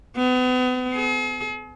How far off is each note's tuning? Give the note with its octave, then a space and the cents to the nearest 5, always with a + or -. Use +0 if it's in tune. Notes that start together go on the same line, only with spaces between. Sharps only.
B3 +35
G#4 +45